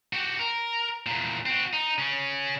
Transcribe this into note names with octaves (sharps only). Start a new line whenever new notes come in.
F#4 G4
A#4
E2 A#2
C4 F#4
D#4
C#3 C#4